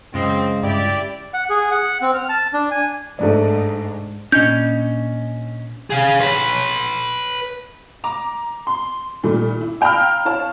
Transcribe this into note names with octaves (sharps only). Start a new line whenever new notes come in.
C#2 F#2 G#3 C4
G2 E4 G4 D5
F#5
G#4
F#5
C4
F6
A5
D4
G#5
G#2 A3 D4 D5
A#2 C#4 D4 D#5 G6
G#4 F5
B4 C#5
A#5 D6
C6
A#2 D#3 G3 A3
E4
F5 G5 A#5 B5 E6 F6
E4 C#5 F5 A5